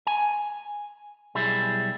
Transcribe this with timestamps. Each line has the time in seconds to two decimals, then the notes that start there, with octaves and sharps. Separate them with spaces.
0.07 G#5
1.35 B1 G3 E4 G#4